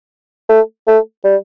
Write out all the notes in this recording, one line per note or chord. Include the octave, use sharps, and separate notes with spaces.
A3
A3
G3